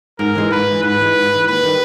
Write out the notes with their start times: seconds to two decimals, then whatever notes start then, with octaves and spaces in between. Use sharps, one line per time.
0.19 G#2 A#4
0.35 E3 G#3
0.51 G#2 B4
0.67 E3 G#3
0.83 G#2 B4
0.99 E3 G#3
1.15 G#2
1.31 E3 G#3
1.48 D#2 B4
1.63 D#3 G3